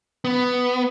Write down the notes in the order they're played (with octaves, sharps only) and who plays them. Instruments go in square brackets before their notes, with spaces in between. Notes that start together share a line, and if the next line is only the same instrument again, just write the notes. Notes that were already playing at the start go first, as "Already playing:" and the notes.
[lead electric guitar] B3